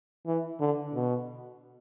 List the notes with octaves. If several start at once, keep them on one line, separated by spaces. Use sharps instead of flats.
E3
D3
B2